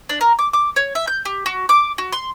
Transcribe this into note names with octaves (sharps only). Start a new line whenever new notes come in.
D4
A#4
D6
D6
C#5
E5
G6
G4
F#4
D6
F#4
C6